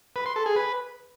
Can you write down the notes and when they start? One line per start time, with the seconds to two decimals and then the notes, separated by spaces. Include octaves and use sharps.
0.16 B4
0.26 C6
0.36 A4
0.46 G#4
0.56 B4